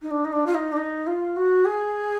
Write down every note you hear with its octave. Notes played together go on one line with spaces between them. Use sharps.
D#4
D4
D#4
D4
F4
D#4
D4
D#4
F4
F#4
G#4